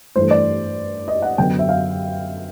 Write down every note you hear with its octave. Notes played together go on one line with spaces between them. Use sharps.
G2 E3 A3 C5
D5
D#5
F#5
F#2 D3 F#3 B3 G5
E5
F5